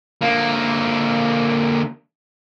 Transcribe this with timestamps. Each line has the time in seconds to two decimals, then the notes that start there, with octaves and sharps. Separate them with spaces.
0.22 D3 A#3